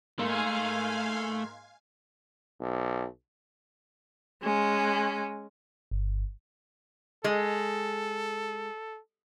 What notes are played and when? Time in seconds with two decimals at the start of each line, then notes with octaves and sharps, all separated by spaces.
0.19 G#2 A3 A#3 F5 G#5
2.61 B1
4.42 G#3 C#4
5.91 G1
7.24 G#3 A4